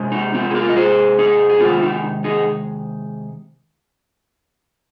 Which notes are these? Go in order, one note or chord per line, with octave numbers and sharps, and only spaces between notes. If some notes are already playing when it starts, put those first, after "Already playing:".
Already playing: C3 G#3
D#4
C4 F4
G#4
F4 A#4
D#5
G#4 C5
D#4 G#4
G#4
C3 D#3 G#3 C4 F4
D#4
D#4 G#4